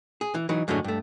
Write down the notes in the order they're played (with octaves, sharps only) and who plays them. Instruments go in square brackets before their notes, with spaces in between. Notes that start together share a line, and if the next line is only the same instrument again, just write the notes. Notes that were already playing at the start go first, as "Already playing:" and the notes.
[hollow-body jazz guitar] G#4
E3
E3 F#3 D#4
F#2 A2 D3 G#3 C#4
G2 A3